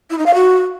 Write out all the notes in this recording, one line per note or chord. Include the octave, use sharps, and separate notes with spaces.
E4
D#4
F5
F#4